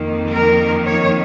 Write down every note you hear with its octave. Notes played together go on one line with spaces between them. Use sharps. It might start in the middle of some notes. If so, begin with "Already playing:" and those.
Already playing: F2 D#3 A#3
A#4
C#5